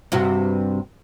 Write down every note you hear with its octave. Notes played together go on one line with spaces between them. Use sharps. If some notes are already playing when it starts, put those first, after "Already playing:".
G2 C3 F#4